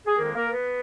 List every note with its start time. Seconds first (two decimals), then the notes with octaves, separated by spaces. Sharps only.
0.07 G#4
0.18 F2 D#3 G#3 A#3 A#4
0.35 A#3 A#4
0.52 B3 B4